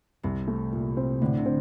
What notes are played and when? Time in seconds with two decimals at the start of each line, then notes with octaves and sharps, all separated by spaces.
0.23 C2 C3
0.48 A3
0.72 A#2
0.97 C4
1.22 A2 D3
1.37 C3
1.46 C4